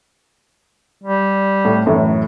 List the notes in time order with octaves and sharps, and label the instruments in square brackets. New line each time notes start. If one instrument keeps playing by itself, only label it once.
[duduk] G3
[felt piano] A2
F#2 A2 E3